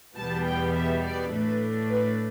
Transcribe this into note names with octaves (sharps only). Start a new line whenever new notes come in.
E2 B2 G3 B3 A5
G5
E5
D5
A2 A3 D4 B4
B4